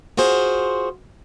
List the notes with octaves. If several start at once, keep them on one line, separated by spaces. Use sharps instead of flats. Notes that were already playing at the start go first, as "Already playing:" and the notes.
F4 F#4 G#4 C5